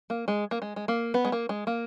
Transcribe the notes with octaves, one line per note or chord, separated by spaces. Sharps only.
A#3
G#3
A#3
G#3
G#3
A#3
B3
G#3
A#3
G#3
A#3